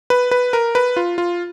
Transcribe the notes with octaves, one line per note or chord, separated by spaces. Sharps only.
B4
B4
A#4
B4
F4
F4